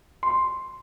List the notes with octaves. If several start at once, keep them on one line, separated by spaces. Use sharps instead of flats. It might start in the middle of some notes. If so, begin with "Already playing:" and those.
C6